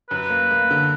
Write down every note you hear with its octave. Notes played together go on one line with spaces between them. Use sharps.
F#2 B4
A#3
A#3
D3